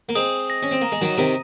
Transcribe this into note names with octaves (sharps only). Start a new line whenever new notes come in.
A#3
G#3 C4 D#6
A#6
C#4
C4
A#3 A#5
G#3
D#3 F#3
C3 D#3 D#7